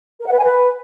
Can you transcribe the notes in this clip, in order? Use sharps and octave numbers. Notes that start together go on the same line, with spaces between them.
A#4
F#5
B4
G#5
B4